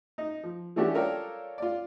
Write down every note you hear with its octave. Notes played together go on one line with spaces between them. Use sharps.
D#4
F3
E3 A3 C#4 D4 F#4 G4
F4 A4 A#4 C#5 D5 G5
F4 D5